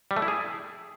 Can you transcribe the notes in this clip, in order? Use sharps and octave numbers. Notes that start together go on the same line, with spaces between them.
G3
A3
E4
G#4